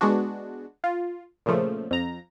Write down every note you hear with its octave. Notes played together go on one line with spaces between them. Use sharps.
G#3 B3 D4 F#4
F4
A#2 C#3 F3 A3
F2 A#5